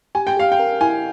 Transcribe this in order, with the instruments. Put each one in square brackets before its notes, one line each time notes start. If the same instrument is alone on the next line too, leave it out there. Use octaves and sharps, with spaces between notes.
[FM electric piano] G4 [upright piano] G#5
[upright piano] G5
[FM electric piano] G4 [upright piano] F5
[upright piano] G5
[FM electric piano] A#4
[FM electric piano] E4 [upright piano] G#5